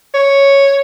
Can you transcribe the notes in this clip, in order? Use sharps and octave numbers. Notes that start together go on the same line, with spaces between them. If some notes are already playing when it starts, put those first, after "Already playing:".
C#5